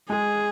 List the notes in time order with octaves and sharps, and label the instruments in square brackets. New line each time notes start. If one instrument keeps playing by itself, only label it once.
[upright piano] G#3 [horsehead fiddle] G#4